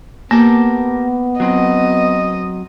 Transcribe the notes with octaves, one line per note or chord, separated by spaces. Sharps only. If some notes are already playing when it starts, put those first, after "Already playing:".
A#3 B3 G4 A#4 A5
F#3 C4 D#5